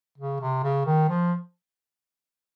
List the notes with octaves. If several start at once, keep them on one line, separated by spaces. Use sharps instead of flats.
C#3
C3
C#3
D#3
F3